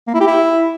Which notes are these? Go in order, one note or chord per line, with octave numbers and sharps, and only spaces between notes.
A#3
E4
G4
E4